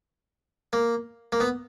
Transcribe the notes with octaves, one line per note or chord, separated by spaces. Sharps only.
A#3
A#3
B3